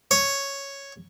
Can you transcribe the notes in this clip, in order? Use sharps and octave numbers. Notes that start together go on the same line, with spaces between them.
C#5